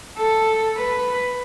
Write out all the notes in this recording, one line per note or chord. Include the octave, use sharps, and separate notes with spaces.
A4
B4